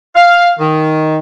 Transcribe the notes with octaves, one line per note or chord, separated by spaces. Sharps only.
F5
D#3